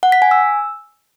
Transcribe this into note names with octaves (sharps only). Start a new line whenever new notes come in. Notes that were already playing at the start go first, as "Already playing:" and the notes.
F#5
B6
G#5
E6